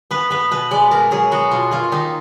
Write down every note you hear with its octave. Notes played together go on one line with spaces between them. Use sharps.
B3 B4
B3 B4
B2 B4
G#3 D5
B2 A#4
F#3 G#4
B3 F#4
B2 F4
A#3 F4
D#3 D#4